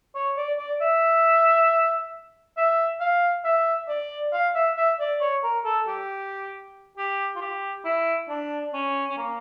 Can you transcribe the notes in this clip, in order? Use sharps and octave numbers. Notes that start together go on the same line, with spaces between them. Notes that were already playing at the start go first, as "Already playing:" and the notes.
C#5
D5
D5
E5
E5
F5
E5
D5
F5
E5
E5
D5
C#5
A#4
A4
G4
G4
F4
G4
E4
D4
C#4
C#4
A#3